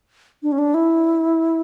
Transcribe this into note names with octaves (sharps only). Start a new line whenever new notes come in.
D4
C#4
D4
E4